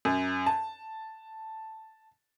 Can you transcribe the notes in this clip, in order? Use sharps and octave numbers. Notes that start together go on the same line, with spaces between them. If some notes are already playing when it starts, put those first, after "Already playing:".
F#2
A5